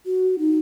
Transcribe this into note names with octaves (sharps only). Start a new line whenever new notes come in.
F#4
D#4